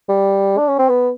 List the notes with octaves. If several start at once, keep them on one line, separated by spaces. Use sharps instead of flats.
G3
D4
C#4
C4
B3